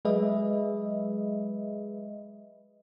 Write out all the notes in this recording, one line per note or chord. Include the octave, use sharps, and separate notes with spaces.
F#3 G#3 G#4 B4 D#5 E5